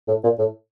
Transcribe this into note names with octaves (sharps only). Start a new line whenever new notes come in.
A2
A#2
A2